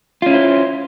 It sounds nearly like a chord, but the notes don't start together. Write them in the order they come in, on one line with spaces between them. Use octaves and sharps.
F4 C#4 E4 C5